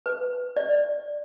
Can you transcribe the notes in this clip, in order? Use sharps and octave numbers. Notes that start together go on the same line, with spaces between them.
B4
D5